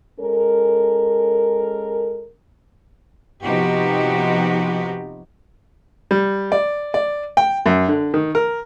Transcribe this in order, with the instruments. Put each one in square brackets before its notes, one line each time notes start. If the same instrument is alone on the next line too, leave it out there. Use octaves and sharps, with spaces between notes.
[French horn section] G#3 C#4 A4 A#4
[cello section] C3 F3 B3 D#4 F#4 G4
[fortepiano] G3
D5
D5
G5
F#2
D3
D#3
A#4